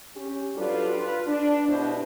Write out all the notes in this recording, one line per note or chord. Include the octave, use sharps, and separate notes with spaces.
C#4 G4
F#3 G3 D4 F4 A4 B4
F4 B4
D4
G2 B2 B3 E4 C5